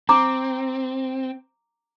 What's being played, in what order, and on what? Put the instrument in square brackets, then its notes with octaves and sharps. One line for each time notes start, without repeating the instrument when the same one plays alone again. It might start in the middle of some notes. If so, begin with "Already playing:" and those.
[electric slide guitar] C4 [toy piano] A#5 D6